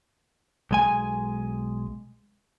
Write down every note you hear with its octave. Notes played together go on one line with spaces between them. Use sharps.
B1 G#3 G#5